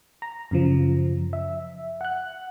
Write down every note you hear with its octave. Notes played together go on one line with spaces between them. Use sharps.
A#5
F#2 C#3 F3
E5
F#5 F#6